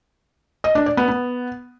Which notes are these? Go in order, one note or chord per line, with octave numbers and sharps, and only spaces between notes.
D#5
D4
D5
B3
B3